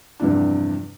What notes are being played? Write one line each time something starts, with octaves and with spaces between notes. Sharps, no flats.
E2 G2 C3 F3 D4